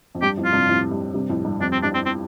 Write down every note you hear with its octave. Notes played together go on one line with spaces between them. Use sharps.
F2
G2 G4
F2 A2
F4
G2 C3
F2 A2
G2
G2 C3
F2 A2
G2
F2 D4
C4
G2 D4
C4
C4